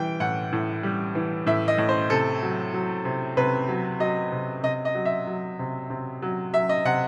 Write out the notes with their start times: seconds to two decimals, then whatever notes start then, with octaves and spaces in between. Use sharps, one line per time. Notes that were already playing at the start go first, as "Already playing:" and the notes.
Already playing: E3 G3 G5
0.20 A2 F#5
0.52 A2
0.83 G3
1.15 E3
1.46 A2 E5
1.68 D#5
1.78 A2
1.89 C5
2.10 C3 A4
2.42 F#3
2.74 F#3
3.05 C3
3.37 C3 B4
3.69 F#3
4.00 F#3 D#5
4.32 C3
4.63 C3 D#5
4.85 D#5
4.95 F#3
5.05 E5
5.27 F#3
5.59 C3
5.90 C3
6.22 F#3
6.53 F#3 E5
6.69 D#5
6.85 C3 F#5